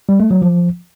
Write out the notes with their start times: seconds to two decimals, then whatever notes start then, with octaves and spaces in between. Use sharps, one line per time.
0.09 G3
0.20 A3
0.31 F#3
0.42 F3